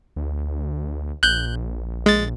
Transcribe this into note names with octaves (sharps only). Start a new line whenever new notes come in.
D2
A#1 F#6 G6
G#3 A6